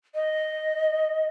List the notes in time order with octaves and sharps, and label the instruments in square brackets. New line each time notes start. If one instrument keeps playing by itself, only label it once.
[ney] D#5